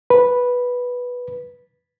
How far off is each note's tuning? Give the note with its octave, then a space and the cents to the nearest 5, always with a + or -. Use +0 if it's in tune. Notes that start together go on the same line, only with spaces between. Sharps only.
B4 -5